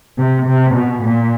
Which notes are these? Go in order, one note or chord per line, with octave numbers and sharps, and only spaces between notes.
C3
C3
B2
A#2